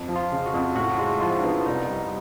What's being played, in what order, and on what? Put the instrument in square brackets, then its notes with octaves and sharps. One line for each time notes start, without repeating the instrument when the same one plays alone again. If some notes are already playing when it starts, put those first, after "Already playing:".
Already playing: [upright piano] F2
F3
[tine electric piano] F4
[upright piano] C#3
[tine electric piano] F#4
[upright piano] F2
[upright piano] A2 [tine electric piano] F#4
[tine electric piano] E4
[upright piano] G#3 [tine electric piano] F4
[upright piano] F3 [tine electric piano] F4
[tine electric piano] D4
[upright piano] B3 [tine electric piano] D#4
[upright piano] C2 [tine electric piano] D#4
[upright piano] G3